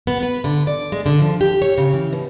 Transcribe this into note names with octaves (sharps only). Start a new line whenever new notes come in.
B3
B4
D3
D5
G#3
D3
F3
G4
C#5
C#3
E3
B2